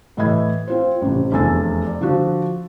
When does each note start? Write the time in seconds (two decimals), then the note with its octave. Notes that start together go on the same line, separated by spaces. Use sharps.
0.17 A2 E3 D#5 E5 B5 G#6
0.68 C4 F4 C5
1.02 A1 C3
1.32 F1 E2 D4 G#5 E6 A6
1.86 D5
2.01 D3 F3 D4 F#4